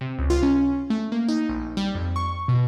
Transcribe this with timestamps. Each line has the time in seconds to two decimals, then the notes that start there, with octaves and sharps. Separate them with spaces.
0.01 C3
0.19 C#2
0.30 F4
0.43 C#4
0.90 A3
1.12 A#3
1.28 D#4
1.49 A#1
1.77 G3
1.95 F2
2.16 C#6
2.48 B2